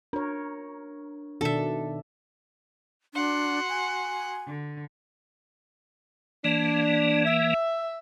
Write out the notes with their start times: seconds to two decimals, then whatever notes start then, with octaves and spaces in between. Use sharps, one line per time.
0.13 D4 A#4 C#5
1.41 B2 D#3 D4 A4 E5
3.14 D4 F#4 F#5 C6
3.69 G#5
4.47 D3
6.44 E3 A#3 D4
7.25 E5